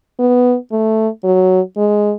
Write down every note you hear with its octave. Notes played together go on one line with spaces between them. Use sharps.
B3
A3
F#3
G#3